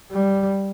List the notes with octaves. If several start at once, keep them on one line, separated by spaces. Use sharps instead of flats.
G3